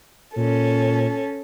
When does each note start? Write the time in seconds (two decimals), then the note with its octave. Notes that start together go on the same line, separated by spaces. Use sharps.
0.36 A#2 C#4 A4